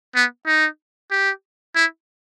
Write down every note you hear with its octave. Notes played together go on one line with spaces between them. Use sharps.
B3
D#4
G4
E4